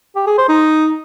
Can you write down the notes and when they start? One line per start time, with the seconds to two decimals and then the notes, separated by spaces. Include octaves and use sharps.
0.16 G4
0.27 G#4
0.38 C5
0.49 D#4